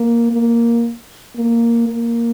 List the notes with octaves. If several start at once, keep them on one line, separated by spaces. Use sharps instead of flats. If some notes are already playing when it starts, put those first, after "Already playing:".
Already playing: A#3
A#3
A#3
A#3